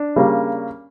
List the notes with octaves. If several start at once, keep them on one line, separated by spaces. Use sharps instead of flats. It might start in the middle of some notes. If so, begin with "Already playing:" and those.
Already playing: D4
C#3 G3 A#3